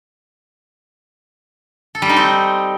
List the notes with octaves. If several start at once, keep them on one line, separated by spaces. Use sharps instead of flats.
A4
G3
D#4
C4